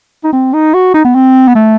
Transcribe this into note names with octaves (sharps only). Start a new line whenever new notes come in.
D#4
C4
D#4
F#4
D#4
B3
C4
B3
A3